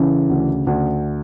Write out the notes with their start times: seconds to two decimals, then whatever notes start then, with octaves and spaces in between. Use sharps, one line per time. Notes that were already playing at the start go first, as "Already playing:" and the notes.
Already playing: C#3 E3
0.29 D2
0.67 D2